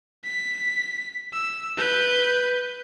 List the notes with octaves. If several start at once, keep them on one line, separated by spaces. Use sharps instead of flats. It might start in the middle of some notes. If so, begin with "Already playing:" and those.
B6
E6
B4 G6